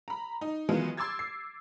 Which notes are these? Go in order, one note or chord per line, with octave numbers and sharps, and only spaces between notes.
A#5 B5
D#4
D#3 E3 F#3 G#3 B3 F4
C6 D6 E6 G#6 A6
C7